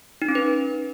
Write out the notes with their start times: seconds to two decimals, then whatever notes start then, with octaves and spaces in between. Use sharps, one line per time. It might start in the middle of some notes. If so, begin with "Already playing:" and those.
0.22 D#4
0.28 C#4
0.35 B4